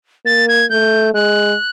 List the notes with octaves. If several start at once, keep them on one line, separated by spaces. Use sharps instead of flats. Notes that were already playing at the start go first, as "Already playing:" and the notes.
A#3 A6
G#6
A3 G6
G#3 F#6